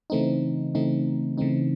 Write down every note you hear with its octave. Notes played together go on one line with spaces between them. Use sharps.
C#3 E3 A3 C4 D#4
C#3 E3 A3 C4 D#4
C#3 E3 A3 C4 D#4